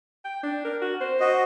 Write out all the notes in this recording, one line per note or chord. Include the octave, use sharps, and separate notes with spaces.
G5
D4
A#4
F#4
C5
F#4 D#5